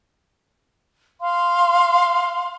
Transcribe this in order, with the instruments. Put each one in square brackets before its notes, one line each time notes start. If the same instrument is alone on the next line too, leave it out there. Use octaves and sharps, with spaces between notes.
[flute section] F5 C6